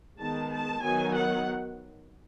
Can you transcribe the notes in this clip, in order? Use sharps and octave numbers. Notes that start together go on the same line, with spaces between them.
D#3 G#3 B3 A5
A5
D#3 F#3 B3 G#5
F#5